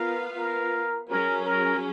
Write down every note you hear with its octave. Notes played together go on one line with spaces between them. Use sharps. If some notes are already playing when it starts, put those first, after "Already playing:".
Already playing: B3 F4 A#4 B4 F5
A#4
F#3 C#4 G#4 A#4
A#4